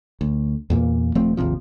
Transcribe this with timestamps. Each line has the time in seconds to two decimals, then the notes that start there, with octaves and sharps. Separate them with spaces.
0.21 D2
0.70 E2 A#2 A#3
1.15 D#1 F3 A3 C4
1.37 G#1 D#2 C3 F3